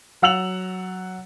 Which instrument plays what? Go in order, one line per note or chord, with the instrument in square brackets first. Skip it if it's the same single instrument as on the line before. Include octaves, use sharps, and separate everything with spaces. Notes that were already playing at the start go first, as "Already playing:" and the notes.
[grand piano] F#3 F#5 E6 F7 F#7